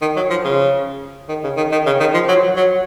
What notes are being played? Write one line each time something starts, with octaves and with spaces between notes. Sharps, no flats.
D#3
F#3
F3
C#3
D#3
C#3
D#3
D#3
C#3
D#3
F3
F#3
F#3